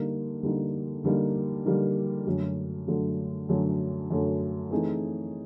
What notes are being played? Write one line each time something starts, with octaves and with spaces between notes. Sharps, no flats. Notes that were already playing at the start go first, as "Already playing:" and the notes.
Already playing: D3 G3 A#3 D#4
D3 G3 A#3 D#4
D3 G3 A#3 D#4
D3 G3 A#3 D#4
F#2 D3 F#3 A3
F#2 D3 F#3 A3
F#2 D3 F#3 A3
F#2 D3 F#3 A3
E3 A3 C4 D#4 G#4